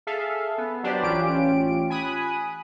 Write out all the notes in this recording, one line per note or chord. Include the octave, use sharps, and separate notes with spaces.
G#4 A4 E5 F5
B3
F#3 D4 G4 B4 C5 D5
A1 C#4 F4 G4 D7
G#5 B5 D#6 F#6